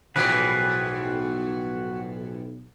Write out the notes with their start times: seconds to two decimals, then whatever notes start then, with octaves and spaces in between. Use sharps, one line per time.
0.16 B1 A2 E3 F3 F#4 G#4 B4